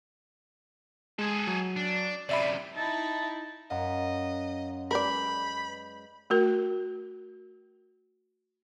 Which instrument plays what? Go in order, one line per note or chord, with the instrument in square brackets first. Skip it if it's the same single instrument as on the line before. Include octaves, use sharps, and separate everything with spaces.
[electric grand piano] G#3 [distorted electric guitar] G#4 A4
[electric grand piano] F#3
[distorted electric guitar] D4
[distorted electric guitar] F#2 C3 [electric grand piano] D5 E5 B5
[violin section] D#4 E4 [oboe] A5
[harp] F#2 [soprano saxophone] D#5 [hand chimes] F5 F#5 A#5
[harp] G#3 [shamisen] A#4 D5 [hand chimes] B4 G6 [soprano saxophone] B5
[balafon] A3 F#4 A#4